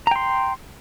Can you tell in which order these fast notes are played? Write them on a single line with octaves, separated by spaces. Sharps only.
A#5 G5 C6